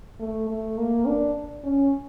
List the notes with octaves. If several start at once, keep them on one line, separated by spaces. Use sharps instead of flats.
A3
A3
A#3
D4
C#4